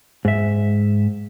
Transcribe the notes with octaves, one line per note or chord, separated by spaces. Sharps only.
G#2 E5